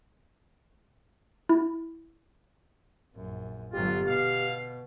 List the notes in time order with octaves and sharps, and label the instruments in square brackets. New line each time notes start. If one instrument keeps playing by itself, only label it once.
[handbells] E4
[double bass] A#1 F#2
[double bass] G1 F#3 [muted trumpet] F4 [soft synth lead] G4
[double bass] B2 [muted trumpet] F5